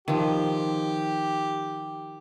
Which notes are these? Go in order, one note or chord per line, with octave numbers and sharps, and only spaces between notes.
D#3 F3 G4